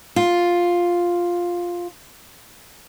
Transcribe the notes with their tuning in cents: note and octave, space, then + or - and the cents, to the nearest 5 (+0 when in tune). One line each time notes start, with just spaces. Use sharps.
F4 +5